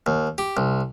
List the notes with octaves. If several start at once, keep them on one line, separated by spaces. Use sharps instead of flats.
D#2
G4
C2